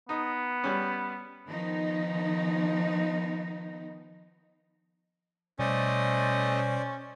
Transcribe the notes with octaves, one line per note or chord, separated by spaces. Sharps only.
B3 D#4
G3 C#4
D#3 F3 B3 D#4
B2 G3 A3 C#4 C5 D5 D#5